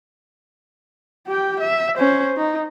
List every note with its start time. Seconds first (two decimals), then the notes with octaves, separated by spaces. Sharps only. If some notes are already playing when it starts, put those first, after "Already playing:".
1.28 G4 G5
1.60 E5
1.97 C#4 C5
2.37 D#4